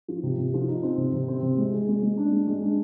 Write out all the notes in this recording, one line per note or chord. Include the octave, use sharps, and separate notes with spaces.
F3
C3
C3
F3
D#4
C4
C3
C3
C4
C3
G#3
G#4
G#3
G#3
D4
G#3
G#3
D4